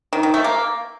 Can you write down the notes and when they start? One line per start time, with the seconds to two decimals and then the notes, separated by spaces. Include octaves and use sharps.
0.13 D#3
0.23 D#3
0.34 A3
0.44 A#3